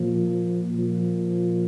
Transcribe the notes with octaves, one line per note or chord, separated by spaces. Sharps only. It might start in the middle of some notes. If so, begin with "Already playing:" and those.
Already playing: A#2 F3
A#2 F3